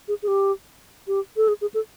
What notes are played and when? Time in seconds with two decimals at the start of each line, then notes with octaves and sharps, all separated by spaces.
0.08 G#4
0.23 G#4
0.28 G4
1.08 G4
1.37 A4
1.48 G#4
1.61 G#4
1.74 A4